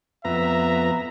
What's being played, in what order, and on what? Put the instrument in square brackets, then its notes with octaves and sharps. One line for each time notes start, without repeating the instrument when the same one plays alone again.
[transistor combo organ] F2 B3 A#5 [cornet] E5